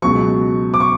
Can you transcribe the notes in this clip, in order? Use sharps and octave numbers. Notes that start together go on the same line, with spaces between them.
C#2 B2 F#3 C#6
D6
C#6